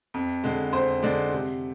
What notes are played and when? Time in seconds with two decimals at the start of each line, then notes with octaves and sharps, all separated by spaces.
0.14 F2
0.44 D3 G#3
0.73 F2 C5
1.03 D3 G#3 D5
1.31 C3